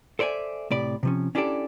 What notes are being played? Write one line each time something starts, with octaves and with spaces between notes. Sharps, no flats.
A4 C5 D5 E5 G#5
A2 C3 D5 B5
C3 F3 C#4
C#4 D4 E4 G4 A4 D5